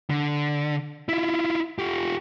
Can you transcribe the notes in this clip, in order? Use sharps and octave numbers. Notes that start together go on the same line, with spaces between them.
D3
E4 F4
F4 G4